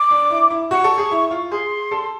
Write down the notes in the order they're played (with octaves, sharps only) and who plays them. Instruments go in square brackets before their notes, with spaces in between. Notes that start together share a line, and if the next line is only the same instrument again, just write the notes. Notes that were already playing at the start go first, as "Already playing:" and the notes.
Already playing: [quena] D6
[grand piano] D4
E4
E4
[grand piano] F#4 [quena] C#6
[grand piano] A4
G#4
E4
F4
[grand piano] G#4 [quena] C6
[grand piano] A4